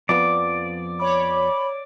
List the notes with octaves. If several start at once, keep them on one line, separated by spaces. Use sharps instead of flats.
F2 F3 B3 D5
C#5 B5 D6